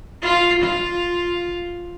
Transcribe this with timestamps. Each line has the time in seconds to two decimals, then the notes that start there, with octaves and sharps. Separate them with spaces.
0.23 F4
0.63 F4